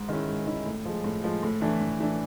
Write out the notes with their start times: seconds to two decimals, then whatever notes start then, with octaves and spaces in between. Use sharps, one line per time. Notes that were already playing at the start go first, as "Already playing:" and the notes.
Already playing: G#2
0.09 D#3 G#3 C#4 E4
0.28 G#2
0.47 D#3 G#3 C#4 E4
0.66 A2
0.85 F3 G#3
1.04 A2
1.24 F3 G#3
1.43 A2
1.61 E3 A3 D4
1.80 A2
2.00 E3 A3 D4